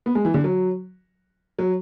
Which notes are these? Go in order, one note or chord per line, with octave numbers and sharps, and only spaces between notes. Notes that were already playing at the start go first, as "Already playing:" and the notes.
B3
G#3
E3
D3
F#3
F#3